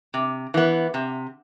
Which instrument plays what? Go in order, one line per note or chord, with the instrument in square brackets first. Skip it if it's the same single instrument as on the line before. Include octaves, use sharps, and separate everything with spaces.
[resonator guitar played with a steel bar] C3
E3 B3
C3